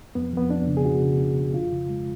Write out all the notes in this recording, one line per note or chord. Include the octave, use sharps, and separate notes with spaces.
F2 B3
F2 B3
F2 D4
C#3
G#4
F2 F#4
C#3
C#3
F2
F2 F4
C#3
G#3